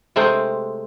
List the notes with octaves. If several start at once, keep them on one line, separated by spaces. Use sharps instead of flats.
C3 G#3 A3 C4